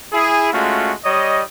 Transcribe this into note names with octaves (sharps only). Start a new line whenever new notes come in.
E4 G#4
G#3 A3 C#4 F4 F#4
G3 C#5 D#5